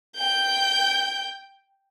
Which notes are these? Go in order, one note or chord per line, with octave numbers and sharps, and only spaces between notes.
G5 G6